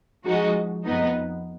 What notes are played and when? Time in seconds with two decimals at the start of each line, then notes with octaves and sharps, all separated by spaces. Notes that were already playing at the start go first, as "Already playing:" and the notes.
0.25 F3 G#3 D#4 F#4
0.84 F2 F3 B3 D#4